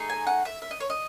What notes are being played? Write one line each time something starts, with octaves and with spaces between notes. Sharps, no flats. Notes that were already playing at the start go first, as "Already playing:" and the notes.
Already playing: A3 D#4 G#4
G#5
F#5
E5
E5
D#5
C#5
D#5